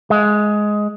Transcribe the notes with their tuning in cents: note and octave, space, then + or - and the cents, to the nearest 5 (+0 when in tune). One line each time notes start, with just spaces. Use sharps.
G#3 +10